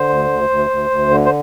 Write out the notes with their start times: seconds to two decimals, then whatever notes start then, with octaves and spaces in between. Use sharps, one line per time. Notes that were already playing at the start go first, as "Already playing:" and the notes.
Already playing: D3 C5
0.09 D2
0.30 D2
0.50 D2
0.70 D2
0.90 D2
1.10 D3
1.25 C5